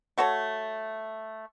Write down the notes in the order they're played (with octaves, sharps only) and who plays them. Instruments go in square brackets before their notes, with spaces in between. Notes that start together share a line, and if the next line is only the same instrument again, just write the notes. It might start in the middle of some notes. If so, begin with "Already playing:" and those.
[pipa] A3 F#4 A4 C#5